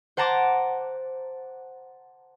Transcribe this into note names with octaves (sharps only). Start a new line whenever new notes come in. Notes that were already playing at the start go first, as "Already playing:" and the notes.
C5 F#5 A5 A#5 C6 D6